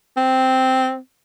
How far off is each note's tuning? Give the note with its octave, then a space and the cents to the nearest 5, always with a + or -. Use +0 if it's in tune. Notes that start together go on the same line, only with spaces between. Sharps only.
C4 -5